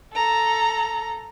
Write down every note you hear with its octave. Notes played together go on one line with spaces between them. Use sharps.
A4 A#5